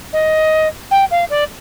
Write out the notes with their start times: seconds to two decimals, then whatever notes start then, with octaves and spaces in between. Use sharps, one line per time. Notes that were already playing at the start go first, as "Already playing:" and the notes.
0.13 D#5
0.91 G5
1.11 F5
1.30 D5